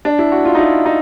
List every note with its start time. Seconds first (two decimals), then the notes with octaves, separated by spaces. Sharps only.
0.05 D4
0.19 E4
0.32 F#4
0.45 F4
0.55 D#4
0.59 E4
0.86 D#4